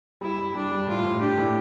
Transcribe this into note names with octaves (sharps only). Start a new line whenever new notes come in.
G3 E4
G3
G3 D4
G3
A2 F4
A2
D4 G4
A2